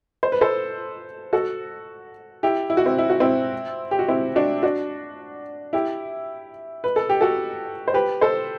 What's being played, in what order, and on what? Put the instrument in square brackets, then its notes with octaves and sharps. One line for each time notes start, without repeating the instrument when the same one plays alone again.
[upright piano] C5
B4
A4 C5
F#4 A4
E4 G4
E4
F#4
C4 E4
E4
F#4
C4 E4
G4
F#4
C4 E4
D4 F#4
D4 F#4
E4 G4
B4
A4
G4
F#4 A4
C5
G4 B4
A4 C5